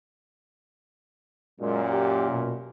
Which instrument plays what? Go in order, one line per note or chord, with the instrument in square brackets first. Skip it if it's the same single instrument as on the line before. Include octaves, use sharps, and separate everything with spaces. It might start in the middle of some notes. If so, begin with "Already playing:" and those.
[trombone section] F#2 A#2 [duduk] G#3
[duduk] G4
B2